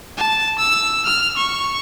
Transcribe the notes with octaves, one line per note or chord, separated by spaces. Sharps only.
A5
E6
F6
C#6